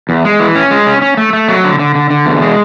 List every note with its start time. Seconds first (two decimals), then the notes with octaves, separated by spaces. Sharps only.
0.09 E2
0.25 G#3
0.40 E3
0.55 C#4
0.71 G#3
0.86 C#4
1.02 C#4
1.17 A3
1.33 A3
1.48 F#3
1.64 D3
1.79 D3
1.95 D3
2.10 D3
2.26 E2
2.41 G#3